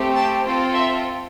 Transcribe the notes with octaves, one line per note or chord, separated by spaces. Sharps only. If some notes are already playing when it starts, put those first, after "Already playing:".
Already playing: A3 C4 G4
A5
C4 F4 A4
E5